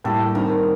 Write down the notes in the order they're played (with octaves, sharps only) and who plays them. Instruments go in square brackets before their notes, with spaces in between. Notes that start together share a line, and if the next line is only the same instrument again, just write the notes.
[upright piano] A2 G3 A#3 [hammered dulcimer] A4
[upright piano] D#3 G3 C4 [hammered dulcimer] A#4